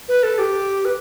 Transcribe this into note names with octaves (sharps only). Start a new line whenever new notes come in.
B4
A4
G4
B4